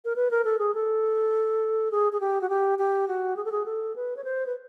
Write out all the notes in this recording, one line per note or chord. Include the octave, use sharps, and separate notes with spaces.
A#4
B4
A#4
A4
G#4
A4
G#4
G#4
G4
F#4
G4
G4
F#4
G#4
A4
G#4
A4
B4
C#5
C5
B4